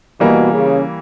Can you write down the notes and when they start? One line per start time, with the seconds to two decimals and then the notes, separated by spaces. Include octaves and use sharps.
0.20 B2 E3 G3 A#3
0.52 C#3